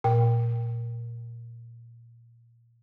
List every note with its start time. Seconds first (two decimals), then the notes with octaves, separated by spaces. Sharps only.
0.04 A#2 G5